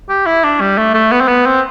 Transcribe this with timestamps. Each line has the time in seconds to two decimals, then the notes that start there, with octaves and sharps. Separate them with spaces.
0.09 G4
0.26 E4
0.44 D4
0.61 G3
0.78 A3
0.94 A3
1.12 B3
1.21 C4
1.28 B3
1.46 C4